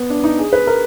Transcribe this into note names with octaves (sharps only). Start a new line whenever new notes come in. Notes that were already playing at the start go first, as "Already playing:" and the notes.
Already playing: B3
D4
D#4
G#4
B4
A#4